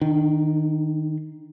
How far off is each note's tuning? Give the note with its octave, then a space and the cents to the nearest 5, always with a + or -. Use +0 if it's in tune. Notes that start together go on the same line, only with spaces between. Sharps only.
D#3 +0 D4 +30